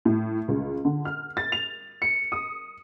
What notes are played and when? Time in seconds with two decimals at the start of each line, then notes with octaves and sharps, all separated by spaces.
0.05 A2
0.48 C#2
0.85 D3
1.05 F6
1.37 A6
1.52 F7
2.02 C#7
2.32 D#6